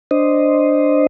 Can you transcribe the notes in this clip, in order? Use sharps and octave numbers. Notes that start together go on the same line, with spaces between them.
D4 C5 D#5